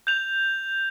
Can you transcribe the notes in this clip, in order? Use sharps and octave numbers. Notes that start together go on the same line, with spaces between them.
G6 F7